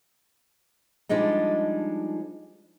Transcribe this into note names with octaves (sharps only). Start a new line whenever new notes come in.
F3 G3 G#3 D4 D#4